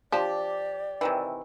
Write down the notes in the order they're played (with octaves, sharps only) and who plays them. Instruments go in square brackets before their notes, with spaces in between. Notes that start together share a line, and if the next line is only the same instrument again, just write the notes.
[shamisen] F3 D4 [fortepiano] G4 [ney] D5
[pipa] C3 D#3 E3